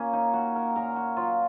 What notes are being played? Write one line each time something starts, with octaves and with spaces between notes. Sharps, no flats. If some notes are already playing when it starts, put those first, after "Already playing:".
Already playing: A#2 A#3 C#4
D#4
A#3 F#4
A#4
A#2 A#4
F#4
F#3 F4